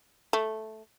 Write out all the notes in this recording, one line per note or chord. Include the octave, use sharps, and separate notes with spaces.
A3